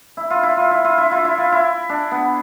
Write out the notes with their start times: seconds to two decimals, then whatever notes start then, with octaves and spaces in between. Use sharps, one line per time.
0.17 E4
0.30 F4
0.43 E4
0.57 F4
0.71 E4
0.84 F4
0.98 E4
1.11 F4
1.25 E4
1.38 F4
1.52 E4
1.89 D4
2.11 B3